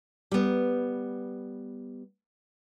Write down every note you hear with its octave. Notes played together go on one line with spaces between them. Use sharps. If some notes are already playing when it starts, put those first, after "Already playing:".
G3 B3